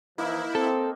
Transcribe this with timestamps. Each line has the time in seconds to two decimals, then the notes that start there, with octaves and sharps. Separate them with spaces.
0.18 E3 F3 A#3 D#4 E4
0.55 C4 A4